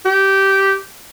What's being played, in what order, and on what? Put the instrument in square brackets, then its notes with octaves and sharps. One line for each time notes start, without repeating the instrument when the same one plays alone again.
[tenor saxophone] G4